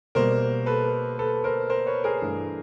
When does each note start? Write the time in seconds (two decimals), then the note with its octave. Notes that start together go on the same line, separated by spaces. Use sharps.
0.15 B2 G3 A#3 A#4 C5
0.66 A4 B4
1.19 A4 B4
1.44 A#4 C5
1.70 A#4 C5
1.87 B4 C#5
2.04 G#4 A#4
2.22 G2 E3 A3